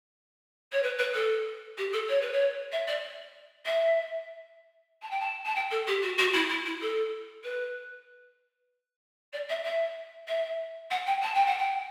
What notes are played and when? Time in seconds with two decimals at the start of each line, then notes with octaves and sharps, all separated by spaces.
0.72 C#5
0.82 B4
0.98 B4
1.14 A4
1.77 G4
1.93 A4
2.09 C#5
2.21 B4
2.32 C#5
2.72 E5
2.87 D5
3.65 E5
5.02 A5
5.10 G5
5.20 A5
5.45 A5
5.55 G5
5.71 A4
5.87 G4
6.02 F#4
6.18 F#4
6.33 E4
6.49 E4
6.65 E4
6.81 A4
7.44 B4
9.33 D5
9.49 E5
9.65 E5
10.28 E5
10.90 F#5
11.06 G5
11.22 A5
11.34 G5
11.46 F#5
11.58 G5